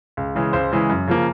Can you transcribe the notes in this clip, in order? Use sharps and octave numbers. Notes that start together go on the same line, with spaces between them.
C#2
C#3 E3 G#3
C#2 C5
C#3 E3 G#3
F#2
C#3 F3 A#3